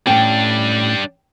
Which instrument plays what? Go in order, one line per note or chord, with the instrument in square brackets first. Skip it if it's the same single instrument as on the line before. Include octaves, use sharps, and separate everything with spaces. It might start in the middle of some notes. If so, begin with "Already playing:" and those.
[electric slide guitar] A2 C#4 [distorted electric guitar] G3 D4 [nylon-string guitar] G5